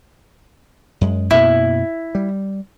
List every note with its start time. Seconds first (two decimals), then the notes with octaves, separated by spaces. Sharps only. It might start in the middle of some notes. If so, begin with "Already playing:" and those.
1.01 F#2 G#3
1.31 F#2 B2 A#3 E4
2.15 G3